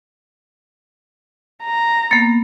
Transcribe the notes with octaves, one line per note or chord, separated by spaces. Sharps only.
A#5
A#3 B3 A6 C#7